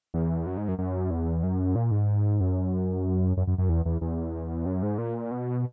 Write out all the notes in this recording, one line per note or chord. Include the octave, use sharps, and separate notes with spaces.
E2
F#2
G#2
F#2
F#2
E2
F#2
A#2
G#2
F#2
F#2
F#2
F#2
E2
E2
E2
F#2
G#2
A#2
B2